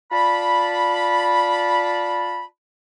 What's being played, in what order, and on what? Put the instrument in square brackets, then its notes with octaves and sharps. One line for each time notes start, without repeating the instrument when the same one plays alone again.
[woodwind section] F4 D5 A5 B5